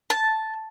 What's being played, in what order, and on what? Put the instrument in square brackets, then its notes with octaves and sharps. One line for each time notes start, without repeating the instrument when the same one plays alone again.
[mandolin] A5